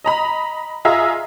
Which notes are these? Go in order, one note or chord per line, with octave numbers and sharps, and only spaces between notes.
D#5 A#5 B5
F4 G#4 D#5 E5 A#5